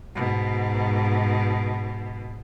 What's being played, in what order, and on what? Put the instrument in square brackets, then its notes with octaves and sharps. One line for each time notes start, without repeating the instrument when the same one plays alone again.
[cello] G#2 B2